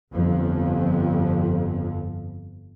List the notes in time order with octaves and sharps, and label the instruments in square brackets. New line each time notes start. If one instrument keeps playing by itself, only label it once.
[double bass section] G1 F2 F3